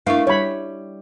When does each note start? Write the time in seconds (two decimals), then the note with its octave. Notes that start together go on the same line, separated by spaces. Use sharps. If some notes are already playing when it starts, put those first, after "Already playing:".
0.06 A3 D4 E4 A#4 F5 C#6
0.27 G3 C#5 B5